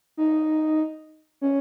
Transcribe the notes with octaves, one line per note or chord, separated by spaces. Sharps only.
D#4
C#4